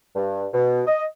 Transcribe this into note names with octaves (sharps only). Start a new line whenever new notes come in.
G2
B2
D#5